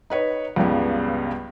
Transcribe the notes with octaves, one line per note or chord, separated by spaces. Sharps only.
D#4 B4 C#5
C#2 G2 C#3 B3